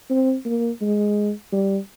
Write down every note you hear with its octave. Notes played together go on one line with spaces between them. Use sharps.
C4
A#3
G#3
G3